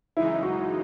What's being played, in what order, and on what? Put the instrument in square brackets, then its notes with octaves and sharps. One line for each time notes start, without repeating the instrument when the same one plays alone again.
[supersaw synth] F#2 C#3 E3 G#3 D#4 [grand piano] E4
[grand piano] F#4